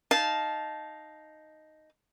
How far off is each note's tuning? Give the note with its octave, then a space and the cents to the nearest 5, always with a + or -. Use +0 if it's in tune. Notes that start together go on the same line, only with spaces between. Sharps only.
D#4 +0 F5 +0 A5 -15